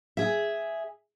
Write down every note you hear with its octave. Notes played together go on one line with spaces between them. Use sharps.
G#4 E5